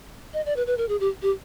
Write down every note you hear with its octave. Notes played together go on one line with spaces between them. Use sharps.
D#5
D5
B4
B4
A#4
G#4
G4
G4